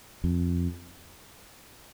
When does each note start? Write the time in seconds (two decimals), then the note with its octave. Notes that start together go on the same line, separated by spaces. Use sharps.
0.24 F2